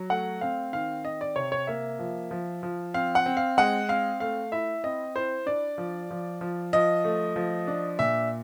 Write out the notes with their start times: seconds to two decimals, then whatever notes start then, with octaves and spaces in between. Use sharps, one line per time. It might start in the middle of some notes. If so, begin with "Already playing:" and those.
Already playing: F#3
0.10 A3 F#5
0.41 C4 F5
0.73 D#3 F5
1.05 C4 D#5
1.21 D5
1.36 C3 C#5
1.52 C#5
1.67 A#3 E5
1.99 F3
2.31 F3
2.63 F3
2.94 C4 F5
3.15 F#5
3.26 C4
3.37 F5
3.58 G#3 F#5
3.89 C4 F5
4.20 A3 F5
4.52 E4 E5
4.84 C4 D#5
5.15 E4 C5
5.46 D4 D5
5.78 F3
6.11 F3
6.41 F3
6.73 F3 D#5
7.04 A3
7.36 F3
7.67 D4
7.99 A#2 E5